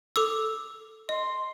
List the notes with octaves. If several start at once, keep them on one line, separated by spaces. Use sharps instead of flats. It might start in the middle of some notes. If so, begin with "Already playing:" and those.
A4 D6 E6
D#5 C6